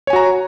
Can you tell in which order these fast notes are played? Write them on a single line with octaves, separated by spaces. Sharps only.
C#5 G#5 F#4 A#5